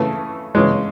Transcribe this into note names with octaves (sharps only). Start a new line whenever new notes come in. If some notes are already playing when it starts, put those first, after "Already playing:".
Already playing: C#3 E3 A3
C#3 E3 G#3